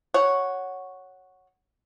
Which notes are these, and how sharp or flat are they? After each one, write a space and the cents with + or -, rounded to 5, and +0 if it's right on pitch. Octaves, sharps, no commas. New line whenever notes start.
F#4 +0 C#5 +0 F#5 +0